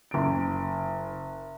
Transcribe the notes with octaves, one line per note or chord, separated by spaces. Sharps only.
F#1 D7